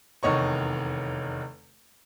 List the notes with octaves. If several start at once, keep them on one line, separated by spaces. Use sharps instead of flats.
F1 E2 D#3 C#5 D#5 C#6